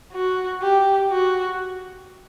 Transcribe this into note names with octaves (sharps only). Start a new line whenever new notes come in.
F#4
G4
F#4